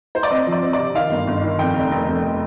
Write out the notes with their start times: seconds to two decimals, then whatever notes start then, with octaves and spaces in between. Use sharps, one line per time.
0.15 C5
0.23 D5
0.31 C4 D#5
0.47 F3
0.52 D5
0.63 C4
0.73 D5
0.79 C3
0.95 D#3 F5
1.11 G1
1.27 G1
1.44 D#3
1.59 F2 G5
1.76 F1
1.91 F1
2.08 F1